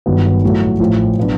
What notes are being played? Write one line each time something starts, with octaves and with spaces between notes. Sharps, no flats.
G1 G2 D#3 F#3 B3
A#1 A2 F#3 A3
A1 A2 F3
B2 F#3 B3 D4